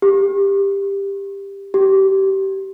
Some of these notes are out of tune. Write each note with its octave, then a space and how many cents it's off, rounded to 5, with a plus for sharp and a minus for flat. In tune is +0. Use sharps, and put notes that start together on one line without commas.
G4 +15
G4 -25